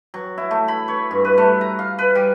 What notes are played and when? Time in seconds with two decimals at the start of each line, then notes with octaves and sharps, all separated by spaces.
0.14 F#3
0.38 E4
0.51 A3
0.68 B5
0.88 C#5
1.11 G2
1.24 B4
1.38 A3
1.61 A#5
1.79 F5
1.98 B4
2.15 G3